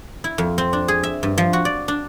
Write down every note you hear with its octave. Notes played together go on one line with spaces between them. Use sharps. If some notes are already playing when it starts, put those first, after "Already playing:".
E4
F2
C4
D4
G#4
E5
G2
F3
F#4
D5
D4